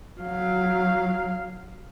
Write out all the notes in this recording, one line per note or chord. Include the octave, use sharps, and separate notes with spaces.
F#3 F5